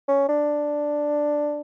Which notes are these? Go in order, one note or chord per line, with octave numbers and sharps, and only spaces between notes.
C#4
D4